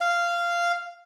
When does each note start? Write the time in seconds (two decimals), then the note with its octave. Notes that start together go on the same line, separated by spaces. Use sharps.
0.01 F5